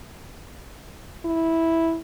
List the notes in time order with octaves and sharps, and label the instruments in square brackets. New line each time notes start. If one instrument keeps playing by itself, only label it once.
[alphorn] E4